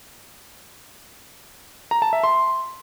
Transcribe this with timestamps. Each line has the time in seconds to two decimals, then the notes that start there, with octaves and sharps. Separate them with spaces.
1.91 A#5
2.02 A5
2.13 E5
2.24 C6